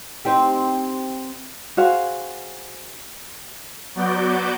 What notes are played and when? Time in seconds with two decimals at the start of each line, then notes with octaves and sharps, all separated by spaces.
0.25 C4 D#4 G4
1.77 F#4 G#4 C5 F5
3.95 F#3 B3 F#4 D5 D6 G6